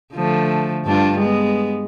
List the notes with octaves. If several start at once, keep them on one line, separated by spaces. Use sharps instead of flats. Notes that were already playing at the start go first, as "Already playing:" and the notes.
D3 F3 A3
G2 D4 F4
G#3 B3